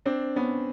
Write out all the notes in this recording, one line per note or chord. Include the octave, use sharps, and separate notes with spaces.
C4 D4
B3 C#4